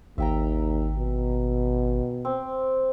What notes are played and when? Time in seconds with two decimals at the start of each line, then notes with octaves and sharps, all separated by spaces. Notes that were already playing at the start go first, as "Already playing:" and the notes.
0.18 G#1 D#2 E5 G5 A#5
0.98 B2
2.25 C4